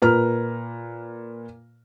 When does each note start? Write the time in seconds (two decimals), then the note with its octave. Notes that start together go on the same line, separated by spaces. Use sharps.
0.02 A#2 A#4 B4 A#5 F6